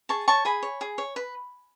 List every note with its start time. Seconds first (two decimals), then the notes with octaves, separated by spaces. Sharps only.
0.09 G#4 A5 C#6
0.28 C#5 A5 C#6
0.45 G#4 G#5 B5
0.63 C#5
0.81 G#4
0.98 C#5
1.16 B4